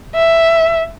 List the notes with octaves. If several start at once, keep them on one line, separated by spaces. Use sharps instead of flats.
E5